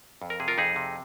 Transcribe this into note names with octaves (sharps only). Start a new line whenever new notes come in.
F2
A#4
C3 G#4
F4 A#4
F2 D#4 G#4
C3